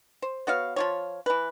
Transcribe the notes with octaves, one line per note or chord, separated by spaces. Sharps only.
C5
B3 F#4 C#5 F5
F3 F4 C#5
E3 B4